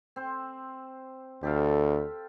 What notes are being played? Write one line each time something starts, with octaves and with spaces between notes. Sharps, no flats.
C4 C5
D2 G4 A4 F5